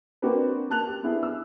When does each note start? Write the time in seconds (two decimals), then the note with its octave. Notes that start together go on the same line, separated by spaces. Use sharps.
0.22 A#3 C4 D4 F#4 B4
0.70 A#3 A5 F#6 F7
0.87 G4
1.03 B3 D4 E4 G#4
1.23 E6